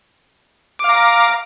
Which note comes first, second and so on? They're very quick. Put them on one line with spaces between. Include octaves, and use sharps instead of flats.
D6 F5 A#5